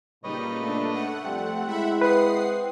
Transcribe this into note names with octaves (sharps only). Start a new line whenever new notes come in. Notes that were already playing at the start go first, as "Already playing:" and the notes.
A#2 C#3 G3 D#4 B4 C#5 D#5
A3 D4
A3 F#5
F2 G3 C4
G#3 E4 E5 F#5 B5
B4 F#5 D#6 C7